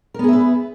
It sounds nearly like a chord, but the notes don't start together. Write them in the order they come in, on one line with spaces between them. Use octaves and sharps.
A#4 B3 G#4 E5 B4